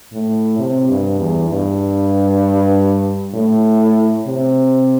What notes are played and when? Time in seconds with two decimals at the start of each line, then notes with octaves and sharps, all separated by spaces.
0.13 A2
0.59 C3
0.89 G2
1.20 E2
1.50 G2
3.34 A2
4.27 C3